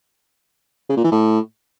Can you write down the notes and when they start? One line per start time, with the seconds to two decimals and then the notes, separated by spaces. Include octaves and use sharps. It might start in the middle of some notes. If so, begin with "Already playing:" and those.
0.89 C#3
0.97 A#2
1.04 E3
1.12 A2